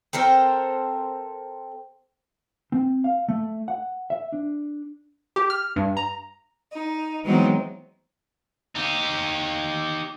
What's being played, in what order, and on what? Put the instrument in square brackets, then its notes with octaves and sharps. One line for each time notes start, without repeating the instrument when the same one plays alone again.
[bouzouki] C4 A4 A#4 C5
[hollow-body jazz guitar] C4
F5
A3
F#5
E5
D4
[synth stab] G4
F6
G2
A#5
[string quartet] D#4
E3 F#3 G#3 B3 C4 D#4
[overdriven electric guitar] D#4 G4